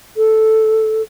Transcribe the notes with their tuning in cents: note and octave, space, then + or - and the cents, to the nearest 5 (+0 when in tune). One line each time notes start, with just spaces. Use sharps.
A4 -5